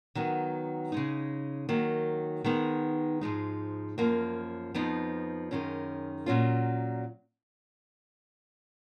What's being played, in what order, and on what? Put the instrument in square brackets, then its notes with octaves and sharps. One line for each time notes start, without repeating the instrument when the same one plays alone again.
[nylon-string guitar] D#3 F#3 B3
C#3 G#3 D#4
D#3 F#3 A#3
D#3 G#3 B3 D#4
G#2 F3 G#3 D#4
F#2 F3 A#3
F2 F3 B3 D#4
F#2 D#3 G#3 C#4
A#2 F#3 C#4 F4